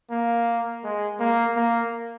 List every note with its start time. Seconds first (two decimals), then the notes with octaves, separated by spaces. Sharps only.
0.11 A#3
0.84 G#3
1.19 A#3
1.57 A#3